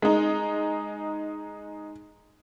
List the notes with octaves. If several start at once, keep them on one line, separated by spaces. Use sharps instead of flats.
G#3 D#4